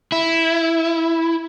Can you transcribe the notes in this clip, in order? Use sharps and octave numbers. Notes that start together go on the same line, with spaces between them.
E4